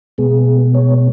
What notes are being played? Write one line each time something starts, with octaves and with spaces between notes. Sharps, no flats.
B2 G#3 B3 G#4
C#5